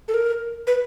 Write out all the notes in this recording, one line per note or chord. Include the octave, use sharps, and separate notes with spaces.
A4
A#4
B4